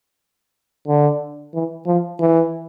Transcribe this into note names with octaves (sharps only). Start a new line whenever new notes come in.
D3
E3
F3
E3